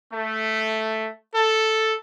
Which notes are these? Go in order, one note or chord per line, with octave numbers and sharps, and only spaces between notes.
A3
A4